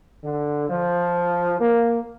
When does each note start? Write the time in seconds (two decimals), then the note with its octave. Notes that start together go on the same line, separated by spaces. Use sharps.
0.23 D3
0.69 F3
1.60 A#3